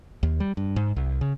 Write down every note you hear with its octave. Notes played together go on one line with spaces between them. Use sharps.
D#2
G3
G2
G#2
C2
C#3